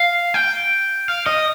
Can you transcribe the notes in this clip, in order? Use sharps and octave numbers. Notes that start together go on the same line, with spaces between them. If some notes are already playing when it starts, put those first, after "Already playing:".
Already playing: F5
G5
F5
D#5